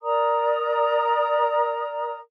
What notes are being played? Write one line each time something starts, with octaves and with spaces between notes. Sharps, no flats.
A#4 D5 A#5 D#6